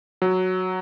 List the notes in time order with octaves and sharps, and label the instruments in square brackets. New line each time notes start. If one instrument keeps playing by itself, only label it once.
[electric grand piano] F#3